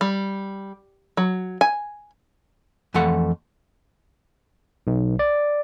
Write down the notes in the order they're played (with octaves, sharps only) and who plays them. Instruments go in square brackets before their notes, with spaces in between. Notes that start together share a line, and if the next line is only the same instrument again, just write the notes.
[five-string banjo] G3
F#3
G#5
[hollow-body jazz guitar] F2 E3 A3 A4 F#5
[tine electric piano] B1
D5